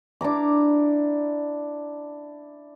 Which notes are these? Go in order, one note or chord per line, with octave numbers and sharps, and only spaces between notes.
D4 E4 A#5 D6